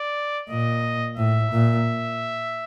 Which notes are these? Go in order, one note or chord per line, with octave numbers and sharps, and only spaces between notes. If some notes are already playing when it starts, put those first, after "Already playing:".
Already playing: D5
A#2 D#5
A2 E5
A#2